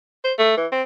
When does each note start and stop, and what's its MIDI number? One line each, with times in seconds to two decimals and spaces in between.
0.24 0.33 72
0.38 0.56 57
0.57 0.66 52
0.72 0.82 60